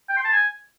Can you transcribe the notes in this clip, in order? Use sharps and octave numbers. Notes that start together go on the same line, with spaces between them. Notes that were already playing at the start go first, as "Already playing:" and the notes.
G5
C6
A5
G#5